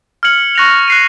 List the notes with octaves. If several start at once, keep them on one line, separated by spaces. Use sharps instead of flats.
F6 G#6 C#7 F#7
C#6 F#6 A#6 F7
F#6 C7 D#7